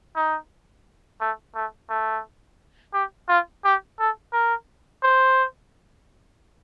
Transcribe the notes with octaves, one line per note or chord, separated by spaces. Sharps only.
D#4
A3
A3
A3
G4
F4
G4
A4
A#4
C5